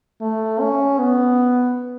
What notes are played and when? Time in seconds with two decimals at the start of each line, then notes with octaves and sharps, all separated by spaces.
0.21 A3
0.60 C#4
0.99 B3